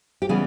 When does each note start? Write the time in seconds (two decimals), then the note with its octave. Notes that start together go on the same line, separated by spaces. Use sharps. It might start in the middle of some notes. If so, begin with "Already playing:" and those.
0.22 G4
0.29 C#3 E3 G3 B3 G#4